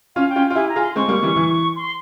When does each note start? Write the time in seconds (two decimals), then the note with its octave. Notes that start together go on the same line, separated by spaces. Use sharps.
0.16 C#4 F4 F5
0.29 G5
0.36 C#4 F4
0.50 F4
0.55 E4 G4 G#5
0.69 A#5
0.76 F4 G#4
0.82 C6
0.96 G#3 C4 C#6
1.08 G3 A#3
1.22 E3 G3
1.36 E3
1.76 C6